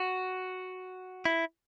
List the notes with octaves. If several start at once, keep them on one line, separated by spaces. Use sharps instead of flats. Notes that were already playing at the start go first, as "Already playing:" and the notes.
Already playing: F#4
E4